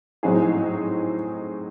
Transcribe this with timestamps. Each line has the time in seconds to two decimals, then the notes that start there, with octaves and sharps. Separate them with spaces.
0.23 A2 F#3 C4 D#4 G#4